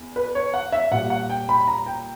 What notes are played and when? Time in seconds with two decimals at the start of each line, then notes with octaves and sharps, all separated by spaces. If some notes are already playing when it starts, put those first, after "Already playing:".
Already playing: E2
0.16 B4
0.35 C#5
0.54 F#5
0.72 E5
0.91 A#2 G3 F#5
1.10 F#5
1.30 G5
1.49 B5
1.68 A#5
1.86 G5